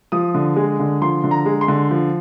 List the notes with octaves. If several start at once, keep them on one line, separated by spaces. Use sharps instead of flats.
F3 D#6
D3
G#3
D3
F3 C6
D3
A#5
G#3
C6
D3
F3